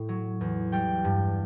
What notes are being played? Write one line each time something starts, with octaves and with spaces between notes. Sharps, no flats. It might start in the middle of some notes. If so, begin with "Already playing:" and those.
Already playing: A2
F#3
E2
G3 G5
G2